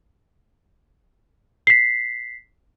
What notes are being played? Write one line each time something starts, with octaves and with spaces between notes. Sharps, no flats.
B6 C7